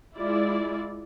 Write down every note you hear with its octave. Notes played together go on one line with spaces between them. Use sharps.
G#3 E4 F4 D5